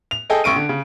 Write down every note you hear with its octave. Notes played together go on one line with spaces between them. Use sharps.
F7
G#4 A4 D#5 G5 G#5
A1 C#6 D7 D#7
D3
C#3